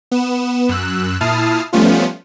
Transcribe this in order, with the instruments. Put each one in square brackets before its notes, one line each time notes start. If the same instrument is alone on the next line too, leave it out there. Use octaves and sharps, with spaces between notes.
[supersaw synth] B3 E7
F#2 E6 F#6
A#2 E4 A5 D#6 F6 C7
F3 G3 A3 B3 C#4 F4